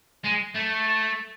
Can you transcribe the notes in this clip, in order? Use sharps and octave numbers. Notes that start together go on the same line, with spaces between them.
G#3
A3